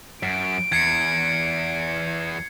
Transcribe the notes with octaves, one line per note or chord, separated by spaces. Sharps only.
F#2 D7
E2 G#6 C7 C#7